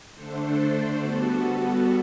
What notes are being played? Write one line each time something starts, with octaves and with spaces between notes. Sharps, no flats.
D3 A3 D4 A4 C5
G3 B3 F#4 A4